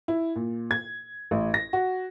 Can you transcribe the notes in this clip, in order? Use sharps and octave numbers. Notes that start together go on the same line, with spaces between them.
E4
A#2
G#6
A1
A#6
F#4